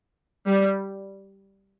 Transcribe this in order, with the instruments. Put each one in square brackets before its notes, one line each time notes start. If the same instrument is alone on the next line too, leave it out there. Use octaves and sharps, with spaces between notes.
[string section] G3